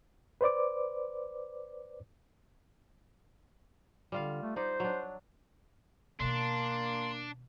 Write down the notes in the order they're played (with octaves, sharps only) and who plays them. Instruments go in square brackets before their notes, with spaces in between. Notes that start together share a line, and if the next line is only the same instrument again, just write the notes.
[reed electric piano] B4 C5 D5 D6
[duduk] D3 [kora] G3 F4 F5
[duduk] A3
[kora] D#4 D5 [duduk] C5
[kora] F#3 D4
[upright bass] B2 D#3 [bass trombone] A#3 [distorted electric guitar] D4 [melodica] C6